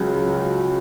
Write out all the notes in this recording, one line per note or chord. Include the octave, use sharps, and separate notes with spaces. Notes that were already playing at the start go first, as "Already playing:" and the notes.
Already playing: C#2 C#3 F#3